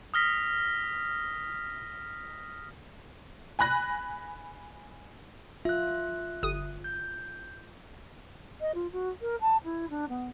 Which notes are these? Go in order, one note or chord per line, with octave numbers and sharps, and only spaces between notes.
D#6 F6 A#6 B6
G#5 B5 F#6 A#6
F4 E5 F#6
G1 D#6 D#7
G6
D#5
F4
F#4
A#4
A5
E4
D4
B3